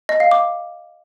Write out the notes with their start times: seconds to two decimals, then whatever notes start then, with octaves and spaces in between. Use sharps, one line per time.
0.09 D#5
0.20 F5
0.31 D6